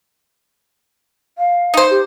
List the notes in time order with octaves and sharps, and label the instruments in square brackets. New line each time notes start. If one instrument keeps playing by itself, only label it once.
[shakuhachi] F5
[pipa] D#4 C5
[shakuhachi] G4